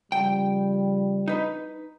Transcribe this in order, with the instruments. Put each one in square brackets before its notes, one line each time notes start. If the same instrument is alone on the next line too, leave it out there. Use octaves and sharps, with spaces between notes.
[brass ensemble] C#3 F3 G3 [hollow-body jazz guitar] G5
[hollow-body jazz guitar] D#4 B4